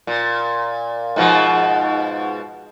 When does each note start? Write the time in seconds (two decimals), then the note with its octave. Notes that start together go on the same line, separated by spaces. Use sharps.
0.07 A#2
1.16 G#2 B2 F3